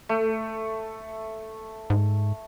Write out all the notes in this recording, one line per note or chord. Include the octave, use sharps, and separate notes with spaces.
A3
G#2